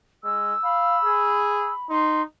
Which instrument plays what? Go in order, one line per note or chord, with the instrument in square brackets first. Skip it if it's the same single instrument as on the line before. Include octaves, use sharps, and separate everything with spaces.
[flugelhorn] G#3 [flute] E6
[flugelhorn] F5 [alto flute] B5
[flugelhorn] G#4
[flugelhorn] D#4 [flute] C6